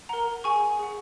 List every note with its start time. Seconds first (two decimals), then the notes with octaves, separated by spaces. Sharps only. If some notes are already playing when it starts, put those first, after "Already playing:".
0.09 A#4 F#5 A#5
0.44 G#4 F#5 G#5 C#6
0.79 G#4 F#5